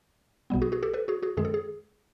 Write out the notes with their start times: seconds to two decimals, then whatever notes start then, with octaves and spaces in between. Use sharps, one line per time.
0.50 B1 B2 G3 B3
0.62 F#4 G#4
0.72 F#4 G#4
0.83 G4 A4
0.94 A4 B4
1.08 F#4 G#4
1.23 F#4 G#4
1.37 F#2 D#3 G#3 G#4
1.45 A4
1.54 G#4